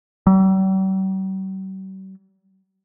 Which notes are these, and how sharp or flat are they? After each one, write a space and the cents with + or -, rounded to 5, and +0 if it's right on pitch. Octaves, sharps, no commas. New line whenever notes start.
G3 -45